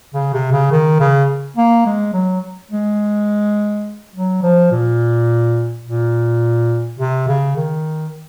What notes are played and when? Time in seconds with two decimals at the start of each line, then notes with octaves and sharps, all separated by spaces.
0.15 C#3
0.34 C3
0.52 C#3
0.71 D#3
1.00 C#3
1.57 A#3
1.86 G#3
2.14 F#3
2.71 G#3
4.15 F#3
4.43 F3
4.72 A#2
5.85 A#2
6.99 C3
7.28 C#3
7.56 D#3